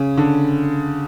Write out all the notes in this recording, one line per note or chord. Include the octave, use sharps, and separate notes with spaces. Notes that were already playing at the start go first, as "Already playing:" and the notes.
Already playing: C#3
D3